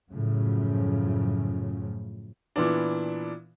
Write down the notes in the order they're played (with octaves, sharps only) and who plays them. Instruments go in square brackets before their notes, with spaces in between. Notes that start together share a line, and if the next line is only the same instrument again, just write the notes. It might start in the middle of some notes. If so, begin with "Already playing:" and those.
[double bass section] F#2 A2 C#3 F3
[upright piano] A#2 E3 B3 D4